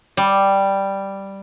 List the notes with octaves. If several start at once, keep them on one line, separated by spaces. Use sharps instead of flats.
G3